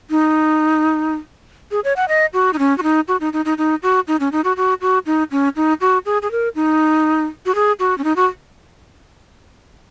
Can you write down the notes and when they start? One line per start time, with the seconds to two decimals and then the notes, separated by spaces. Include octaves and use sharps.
0.10 D#4
1.71 G#4
1.84 C#5
1.96 F#5
2.09 D#5
2.33 F#4
2.53 D#4
2.59 C#4
2.78 F#4
2.83 D#4
3.08 F#4
3.21 D#4
3.33 D#4
3.45 D#4
3.58 D#4
3.83 F#4
4.08 D#4
4.20 C#4
4.32 D#4
4.44 F#4
4.57 F#4
4.81 F#4
5.06 D#4
5.31 C#4
5.56 D#4
5.81 F#4
6.06 G#4
6.22 G#4
6.31 A#4
6.55 D#4
7.46 F#4
7.55 G#4
7.79 F#4
7.98 C#4
8.04 D#4
8.16 F#4